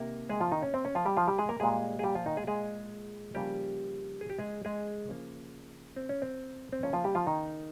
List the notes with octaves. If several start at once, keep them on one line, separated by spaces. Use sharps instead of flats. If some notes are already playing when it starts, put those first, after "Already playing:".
Already playing: C3 D#3 A#3 A#4
G#3 G#4
F3 F4
D#3 D#4
C#4
C4
C#4
F3 F4
G3 G4
F3 F4
G3 G4
G#3 G#4
A#3 A#4
A#2 G3 G#3 A#3 G#4
G#4
G3 G4
F3 F4
D#3 D#4
G#3 G#4
G#3 G#4
C#3 F3 G3 A#3 G4
G#4
G4
G#3 G#4
G#3 G#4
C#3 F3 A#3
C4
C#4
C4
C4
C#3 F3 A#3 C#4
F3 F4
G3 G4
F3 F4
D#3 D#4